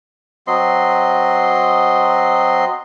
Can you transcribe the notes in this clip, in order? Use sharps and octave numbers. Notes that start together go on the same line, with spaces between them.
F#3 C4 D#5 C6